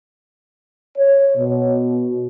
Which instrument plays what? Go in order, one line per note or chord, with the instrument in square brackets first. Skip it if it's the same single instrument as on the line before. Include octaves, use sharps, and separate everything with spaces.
[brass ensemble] C#5
B2